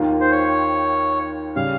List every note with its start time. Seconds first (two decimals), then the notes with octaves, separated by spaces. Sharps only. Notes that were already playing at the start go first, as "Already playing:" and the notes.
Already playing: D#2 D#3 A#3 F4
0.20 C5
0.31 C#5
1.56 C#3 G3 F5